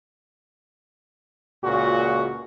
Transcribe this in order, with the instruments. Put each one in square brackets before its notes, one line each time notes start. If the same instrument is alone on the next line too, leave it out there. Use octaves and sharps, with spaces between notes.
[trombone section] C#2 A#2 C#3 F#4